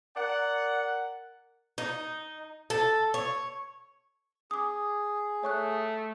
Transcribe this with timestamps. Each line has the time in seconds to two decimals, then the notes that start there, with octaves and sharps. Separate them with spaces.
0.16 A#4 D5 F#5
1.78 D#4
2.70 A4
3.14 C#5
4.51 G#4 D6 D#6
5.43 A3 C#5 C#6 F#6